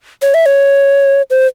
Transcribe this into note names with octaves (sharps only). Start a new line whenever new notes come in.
C#5
E5
C#5
C5